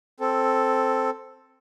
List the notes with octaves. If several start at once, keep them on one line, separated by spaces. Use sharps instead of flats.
C4 A4